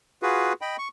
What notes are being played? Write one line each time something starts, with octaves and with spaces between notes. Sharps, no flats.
F4 F#4 G#4 B4
D#5 G5 B5
C#6